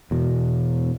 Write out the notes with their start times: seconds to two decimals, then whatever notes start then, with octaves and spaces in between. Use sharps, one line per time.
0.11 E2 B2